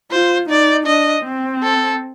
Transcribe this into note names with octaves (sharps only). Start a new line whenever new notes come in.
F4 C5
D#4 D5
D4 D#5
C4
A4